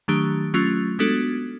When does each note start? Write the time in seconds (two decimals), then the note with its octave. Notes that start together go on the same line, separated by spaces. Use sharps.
0.08 D#3 F#3 A3 D4 G4
0.54 F#3 A3 C#4 F4
0.99 G#3 B3 D4 F#4 A4